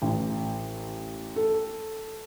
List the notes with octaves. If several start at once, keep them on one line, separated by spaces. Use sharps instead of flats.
A1
A4